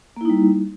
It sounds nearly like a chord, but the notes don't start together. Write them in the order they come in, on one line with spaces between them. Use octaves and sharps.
A#3 E4 D#4 G3